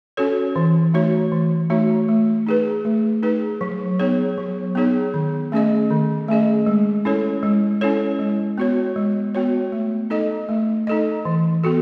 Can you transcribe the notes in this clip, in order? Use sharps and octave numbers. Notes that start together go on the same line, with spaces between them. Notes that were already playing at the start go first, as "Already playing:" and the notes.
C#4 F#4 A4 C#5
E3
A3 D#4 F#4 C#5
E3
A3 D#4 F#4 C#5
A3
D#4 G#4 B4
A3
D#4 G#4 B4
F#3
B3 D#4 G#4 C#5
F#3
B3 D#4 G#4 C#5
D#3
A3 C#4 G#4 D#5
D#3
A3 C#4 G#4 D#5
G#3
C#4 E4 A4 C#5
G#3
C#4 E4 A4 C#5
G#3
B3 F#4 C#5
G#3
B3 F#4 C#5
A3
D#4 A4 D#5
A3
D#4 A4 D#5
E3
B3 F#4 A4